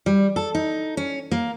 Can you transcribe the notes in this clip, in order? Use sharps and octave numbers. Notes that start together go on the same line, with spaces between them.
G3
A4
D#4
C#4
A#3